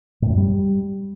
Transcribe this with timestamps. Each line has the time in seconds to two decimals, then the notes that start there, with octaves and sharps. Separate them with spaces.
0.22 A2
0.30 F#2
0.37 G3